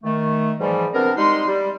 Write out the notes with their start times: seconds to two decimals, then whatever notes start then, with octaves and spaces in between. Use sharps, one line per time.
0.04 D#3 A3
0.59 G#2 E3 F3 G3
0.93 C3 B3 C4 D4 A#4
1.17 G3 G#3 D#4 C6
1.47 G3